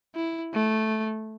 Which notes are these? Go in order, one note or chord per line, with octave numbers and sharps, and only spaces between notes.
E4
A3